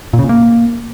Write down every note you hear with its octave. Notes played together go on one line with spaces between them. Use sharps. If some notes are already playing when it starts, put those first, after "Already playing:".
A#2
C#3
A#2
A#3